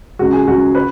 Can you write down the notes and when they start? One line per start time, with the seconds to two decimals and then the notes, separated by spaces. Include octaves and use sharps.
0.19 C#2 C#3 G#3 F#4
0.33 G#4
0.47 C#2 C#3 G#3 F#4
0.75 B4